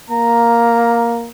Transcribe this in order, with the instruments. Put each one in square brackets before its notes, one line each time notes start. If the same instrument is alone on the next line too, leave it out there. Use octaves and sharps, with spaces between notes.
[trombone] A#3 [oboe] A#5